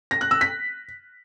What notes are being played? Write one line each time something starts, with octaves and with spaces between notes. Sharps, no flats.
A#6
F#6
E6
B6